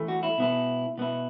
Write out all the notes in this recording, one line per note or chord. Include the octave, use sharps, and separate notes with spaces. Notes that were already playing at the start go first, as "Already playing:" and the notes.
Already playing: E3 A3
F#4
E4
B2 B3 E4
B2 B3 E4